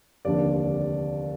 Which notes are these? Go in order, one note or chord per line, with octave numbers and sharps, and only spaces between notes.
F1 D#2 D3 D5